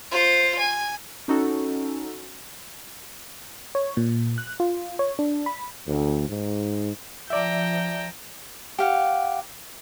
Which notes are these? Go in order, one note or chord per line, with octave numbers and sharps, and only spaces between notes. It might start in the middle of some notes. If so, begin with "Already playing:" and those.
F4 C5
G#5
C#4 D#4 F#4 A4
C#5
A#2
F#6
F4
C#5
D4
B5
D2
G#2
F3 D5 E5 G5 A5 A#5
G4 F5 F#5